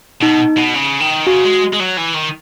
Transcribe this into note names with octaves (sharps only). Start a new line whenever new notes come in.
B2 D#4
B2
C#3
D#3
C#3 F#4
G#3
G#3
F#3
E3
D#3